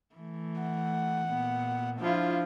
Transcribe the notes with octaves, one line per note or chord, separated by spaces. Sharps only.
E3 A3
F#5
A#2 B3
F3 D4 E4 F4